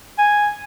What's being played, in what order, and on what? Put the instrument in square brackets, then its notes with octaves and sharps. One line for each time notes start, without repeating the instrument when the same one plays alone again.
[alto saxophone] G#5